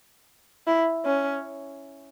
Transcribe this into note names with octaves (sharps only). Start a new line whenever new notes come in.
E4
C#4